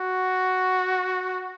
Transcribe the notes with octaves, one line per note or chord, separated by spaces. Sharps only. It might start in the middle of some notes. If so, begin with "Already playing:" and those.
Already playing: F#4